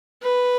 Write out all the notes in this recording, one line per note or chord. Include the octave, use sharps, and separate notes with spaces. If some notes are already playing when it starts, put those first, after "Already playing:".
B4